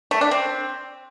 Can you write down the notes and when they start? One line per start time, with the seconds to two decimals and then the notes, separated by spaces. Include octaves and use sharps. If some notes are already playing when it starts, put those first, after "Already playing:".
0.11 A3
0.21 D4
0.31 C4